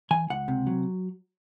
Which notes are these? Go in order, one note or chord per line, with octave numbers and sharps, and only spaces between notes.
E3 G#5
C#2 F#5
C3
F#3